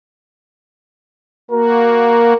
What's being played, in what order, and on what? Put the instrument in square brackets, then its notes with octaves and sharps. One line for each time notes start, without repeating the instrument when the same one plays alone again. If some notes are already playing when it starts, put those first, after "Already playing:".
[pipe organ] A#3 F#4 [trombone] A#4